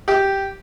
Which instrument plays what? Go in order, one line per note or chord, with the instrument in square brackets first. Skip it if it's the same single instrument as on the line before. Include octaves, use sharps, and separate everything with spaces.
[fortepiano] G4